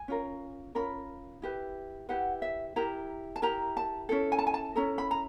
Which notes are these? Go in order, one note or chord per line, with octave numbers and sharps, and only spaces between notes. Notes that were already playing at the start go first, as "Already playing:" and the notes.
Already playing: G#5
C#4 F4 A#4
C#4 F4 A#4 B5
E4 G4 B4
E4 G4 B4 F#5
E5
E4 G4 A#4 A#5
A5
E4 G4 A#4 A#5
A5
C#4 E4 A4
G#5
A5
G#5
A5
C#4 E4 A4 A#5
B5
A#5